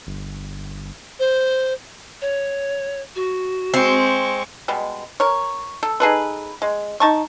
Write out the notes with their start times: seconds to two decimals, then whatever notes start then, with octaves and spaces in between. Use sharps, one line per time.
0.07 G1
1.19 C5
2.22 C#5
3.16 F#4
3.74 G#3 C4 C#6
4.68 B2 G3 G#3
5.20 A#4 C#5
5.83 A4
6.00 D#4 G#4 A4 B4
6.62 G#3
7.00 D#4 A5 C#6